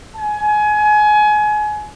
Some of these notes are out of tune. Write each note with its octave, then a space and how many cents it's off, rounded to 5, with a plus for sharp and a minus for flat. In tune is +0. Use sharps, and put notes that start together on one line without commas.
G#5 +25